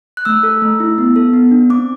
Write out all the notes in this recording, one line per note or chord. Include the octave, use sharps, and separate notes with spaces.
F#6
A3 E6
A4
A3
E4
B3
A4
B3
D4
C4 D6